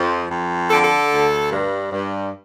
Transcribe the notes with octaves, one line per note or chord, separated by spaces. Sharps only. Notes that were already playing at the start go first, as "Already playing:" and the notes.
Already playing: F2 F3
F2
D3 A4
A4
D2
G2
G2